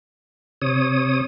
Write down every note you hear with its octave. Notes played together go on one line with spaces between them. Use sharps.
C3 C#5 D#6